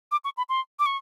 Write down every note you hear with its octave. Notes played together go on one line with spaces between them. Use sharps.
D6
C#6
B5
C6
D6
C#6